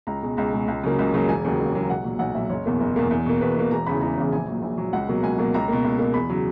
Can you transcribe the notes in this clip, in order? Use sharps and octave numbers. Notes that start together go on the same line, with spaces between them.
C#2 A#5
B2 G#3
C#2 A#5
B2 G#3
C#2
C#3 F#3 A#3
C#2
C#3 F#3 A#3
E1 G#5
D#2 C#3 F#3 A#3
E1
D#2 C#3 F#3 A#3
B1 F#5
A#2 F#3
B1 F#5
A#2 F#3 E5
F#1 C#5
E2 B2 A#3
F#1
E2 B2 A#3
E2
B2 A#3
E2 B4
B2 A#3
E1 A#5
E2 C#3 E3 B5
E1 A#5
E2 C#3 E3
A#1 G#5
A#2 F#3
A#1
A#2 F#3
C#2 F#5
B2 F#3 A#3
C#2 G#5
B2 F#3 A#3
C#2 A#5
B2 A#3
C#2
B2 A#3
E2 B5
C#3 F#3